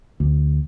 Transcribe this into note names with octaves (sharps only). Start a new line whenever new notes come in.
D2